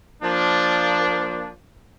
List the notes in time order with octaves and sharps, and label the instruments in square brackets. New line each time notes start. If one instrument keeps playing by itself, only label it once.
[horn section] F3 A#3 D4